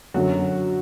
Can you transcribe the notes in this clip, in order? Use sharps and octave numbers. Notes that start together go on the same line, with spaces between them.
F#2 D3 F#3 F#4